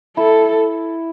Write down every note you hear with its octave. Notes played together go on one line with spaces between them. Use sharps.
E4 A4